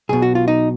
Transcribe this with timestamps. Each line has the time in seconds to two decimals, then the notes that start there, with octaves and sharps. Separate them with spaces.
0.09 B1 B2 G#4
0.22 F#4
0.35 F4
0.48 D#4